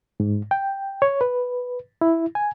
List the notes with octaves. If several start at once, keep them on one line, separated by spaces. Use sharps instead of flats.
G#2
G5
C#5
B4
E4
G#5